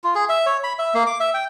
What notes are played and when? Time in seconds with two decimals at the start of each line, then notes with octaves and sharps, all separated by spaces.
0.04 F4
0.15 G#4
0.29 E5
0.46 C#5
0.64 B5
0.79 E5
0.94 A#3
1.06 D6
1.20 E5
1.34 G5